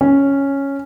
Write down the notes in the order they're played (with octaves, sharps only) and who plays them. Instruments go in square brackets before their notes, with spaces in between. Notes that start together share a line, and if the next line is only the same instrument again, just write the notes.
[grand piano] C#4